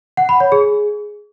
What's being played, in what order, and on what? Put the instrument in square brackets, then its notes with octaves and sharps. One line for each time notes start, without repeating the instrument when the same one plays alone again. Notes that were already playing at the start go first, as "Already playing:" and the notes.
[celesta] F#5
B5
C#5
G#4